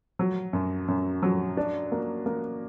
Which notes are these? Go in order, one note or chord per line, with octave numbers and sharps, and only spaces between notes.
F#3
F#2
F#2
F#3
D4
A#3
A#3